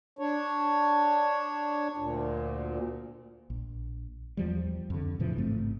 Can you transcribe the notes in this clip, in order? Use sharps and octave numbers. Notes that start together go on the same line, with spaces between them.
D4 C#5
D2 A#2
A#1
E2 F3 G3
F2 D3
A2 C#3 E3 F3
A1 G#2 A3 C4